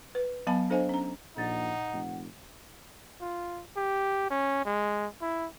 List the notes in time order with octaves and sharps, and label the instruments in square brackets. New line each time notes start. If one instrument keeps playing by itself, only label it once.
[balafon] B4
F#3 B3 F5 A5 B5
D4 A4 C5 D#5 F5 G#5
C#4 A#5
[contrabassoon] A#1 [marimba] A#2 A6 [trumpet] D#4 [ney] F#5
[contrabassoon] F1
[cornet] F4
G4
C#4
G#3
E4